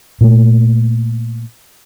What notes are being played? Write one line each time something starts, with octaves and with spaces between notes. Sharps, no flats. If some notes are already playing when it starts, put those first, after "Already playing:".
A#2 A3